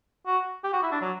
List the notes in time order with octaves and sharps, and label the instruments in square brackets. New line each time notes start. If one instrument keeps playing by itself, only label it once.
[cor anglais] F#4
G4
F#4
E4
D4
F#3